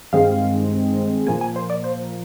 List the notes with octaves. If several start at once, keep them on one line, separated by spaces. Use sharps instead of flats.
G2 D#3 G#3 C4 F5
A#2 F3 A#3 G#5
G#5
C5
D5
C5